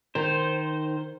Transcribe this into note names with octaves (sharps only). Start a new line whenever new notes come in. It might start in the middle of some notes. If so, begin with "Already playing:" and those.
D#3 C5